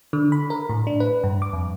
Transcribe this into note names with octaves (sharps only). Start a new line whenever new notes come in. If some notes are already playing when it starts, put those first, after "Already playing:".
D3
B5
A#4
A2
D4
B4
G2
D6
F2